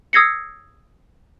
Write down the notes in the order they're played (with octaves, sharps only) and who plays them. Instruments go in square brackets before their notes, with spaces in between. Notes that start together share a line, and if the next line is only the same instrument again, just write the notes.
[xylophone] D#6 E6 G#6 A#6 C7 C#7